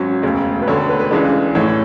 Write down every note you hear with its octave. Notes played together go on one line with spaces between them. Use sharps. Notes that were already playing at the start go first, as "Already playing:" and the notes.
Already playing: G#1 F#3 C#4
E1 D2 C#3
B4
E1 D2 D3 C#5
A4
B4
B4
C#2 C#3 E3 G#3 D4
A1 A2 E3 C#5